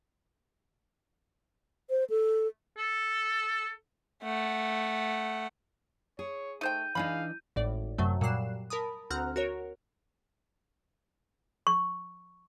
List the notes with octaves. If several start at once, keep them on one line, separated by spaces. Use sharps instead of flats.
C5
A4
A4
A3 F#5
G#4 C#5
A3 D#4 C5 G5 G6 D#7
E3 G#3 D4 D#4 G#4 F5 B5
G#1 A2 D5
F#2 C3 F#3 A3
A#2 F#3 G3 F#6 C7 E7
A#4 A5 B5 D#6
D2 C4 F#5 A#5 F6 F#6
F#4 A#4 C#5
C#6